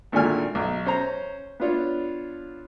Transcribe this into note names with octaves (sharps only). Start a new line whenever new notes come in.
G#1 A#2 D3 A3 G#5 F6
B1
C#4 C5 A#5
B3 D4 F4 C#5